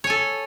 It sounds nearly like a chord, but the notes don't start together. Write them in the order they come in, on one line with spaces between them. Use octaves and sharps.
C#5 G#5 A4